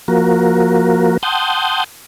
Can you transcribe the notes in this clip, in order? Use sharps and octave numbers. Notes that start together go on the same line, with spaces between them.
F3 A#3 F#4 A#4
F#5 G5 A5 C6 D#6 G6